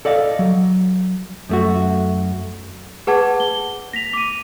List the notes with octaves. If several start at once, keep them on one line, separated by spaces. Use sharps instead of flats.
A4 D5 D#5 F5
F#3
F#2 A3 F#4
G#4 B4 F#5 A5 D6 G#6
G7
A#6 B6 F7
D6 D#7